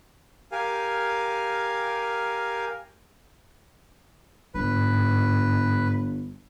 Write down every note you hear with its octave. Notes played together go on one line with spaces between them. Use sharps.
G4 A#4 F5 G#5
G1 G#2 B4